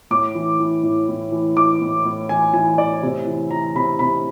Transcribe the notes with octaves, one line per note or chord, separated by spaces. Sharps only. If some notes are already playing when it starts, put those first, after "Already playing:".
A2 D6
E3
E3
A2
A2
E3
E3 D6
A2
A2
E3 G#5
E3 G#5
A2 D5
C3
E3
E3 A#5
C3 B5
C3 B5